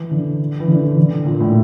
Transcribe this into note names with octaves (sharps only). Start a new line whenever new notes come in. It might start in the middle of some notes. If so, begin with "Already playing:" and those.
Already playing: E3
D3
E3
D3
E3
D3
A#2
A2